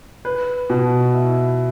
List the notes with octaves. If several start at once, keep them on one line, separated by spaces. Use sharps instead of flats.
B4
B2
E4